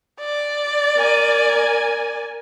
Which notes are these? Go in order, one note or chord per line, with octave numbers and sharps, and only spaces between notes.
D5
A#4 G#5